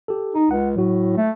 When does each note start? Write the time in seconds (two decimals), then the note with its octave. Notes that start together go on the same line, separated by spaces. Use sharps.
0.08 G4 A4
0.35 D#4
0.51 C#2 F#5
0.76 A2 F#3 F#4
1.17 A3